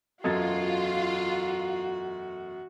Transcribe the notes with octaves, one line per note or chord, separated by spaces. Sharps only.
E1 F#2 F4 F#4 A4 D#5 G#6 A6